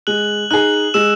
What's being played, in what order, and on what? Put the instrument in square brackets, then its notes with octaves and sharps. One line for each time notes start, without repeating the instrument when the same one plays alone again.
[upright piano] G#3 [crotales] F#6 F#7
[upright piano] D#4 G#4 [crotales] F#6 F#7
[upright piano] G#3 [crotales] E6 E7